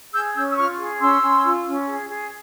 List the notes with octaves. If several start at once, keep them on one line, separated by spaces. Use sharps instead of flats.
G#4 E6 G6
C#4 E6 G6
E6
F4 C#6 F6
G#4
C#4 C6 E6
C#4
F4
C#4
G#4
G#4